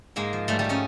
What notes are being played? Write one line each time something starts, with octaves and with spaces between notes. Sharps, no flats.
G#2 G#3 A#3
F3
G#2 G3 A3
G3 A3
F3
C#4 D#4